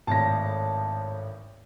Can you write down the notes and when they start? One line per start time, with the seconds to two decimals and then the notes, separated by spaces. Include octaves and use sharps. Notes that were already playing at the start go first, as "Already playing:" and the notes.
0.07 G#1 A2 A5 A#6